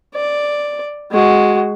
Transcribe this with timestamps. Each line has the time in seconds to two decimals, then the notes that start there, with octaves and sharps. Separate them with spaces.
0.14 D5
1.12 G#3 F#4